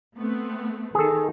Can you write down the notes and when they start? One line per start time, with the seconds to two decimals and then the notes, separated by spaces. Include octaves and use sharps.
0.17 A3 B3 C4
0.95 D#3 G#4 A4